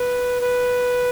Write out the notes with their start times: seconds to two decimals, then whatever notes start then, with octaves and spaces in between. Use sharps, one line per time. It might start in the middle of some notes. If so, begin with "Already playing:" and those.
Already playing: B4
0.42 B4